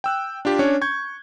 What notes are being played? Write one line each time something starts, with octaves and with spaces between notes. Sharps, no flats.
G5 E6 F#6
D4 F4 G4
C#4 D4 C#5
C#6 G6 G#6